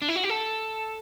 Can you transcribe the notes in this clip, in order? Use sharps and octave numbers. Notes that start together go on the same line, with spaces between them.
D4
E4
F#4
G4
A4